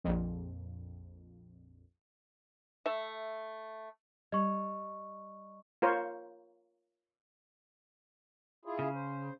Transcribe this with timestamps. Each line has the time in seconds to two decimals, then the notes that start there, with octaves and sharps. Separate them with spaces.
0.04 A#1 F2
2.86 A3 E5
4.32 G3 D#5 C#6
5.82 F4 A#4 C5 C#5
8.65 E4 F4 G#4
8.79 C#3
8.95 C5